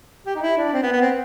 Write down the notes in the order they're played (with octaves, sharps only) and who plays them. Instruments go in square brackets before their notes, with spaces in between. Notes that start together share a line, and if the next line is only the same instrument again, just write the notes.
[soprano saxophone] G4
D#4
E4
D4
C4
B3
B3
C4